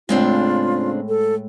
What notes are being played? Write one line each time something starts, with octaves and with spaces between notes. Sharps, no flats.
A2 C#3 G#3 C4 D4 F4
A4